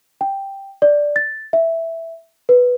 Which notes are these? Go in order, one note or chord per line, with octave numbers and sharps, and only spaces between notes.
G5
D5
A6
E5
B4